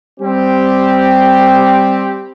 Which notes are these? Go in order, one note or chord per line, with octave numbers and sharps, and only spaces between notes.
G3 C4 G4